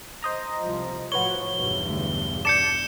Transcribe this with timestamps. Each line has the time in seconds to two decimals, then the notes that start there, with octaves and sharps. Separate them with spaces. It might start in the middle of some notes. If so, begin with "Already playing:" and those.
0.23 C5 D#5 A#5
0.64 C2 F3
1.12 A2 F3 F#4 B4 C#5 G7
1.55 B1 E2 G2
1.89 D2
2.45 D5 A5 G6 C#7 E7